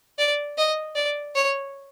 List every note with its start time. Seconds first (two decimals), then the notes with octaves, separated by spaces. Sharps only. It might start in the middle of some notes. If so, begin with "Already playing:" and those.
0.18 D5
0.58 D#5
0.95 D5
1.35 C#5